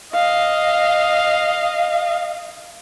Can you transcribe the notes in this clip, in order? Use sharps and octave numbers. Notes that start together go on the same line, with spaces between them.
D#5 F5